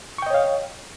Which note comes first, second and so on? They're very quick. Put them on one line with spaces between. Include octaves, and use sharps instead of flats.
C#6 G5 D#5 C#5 F5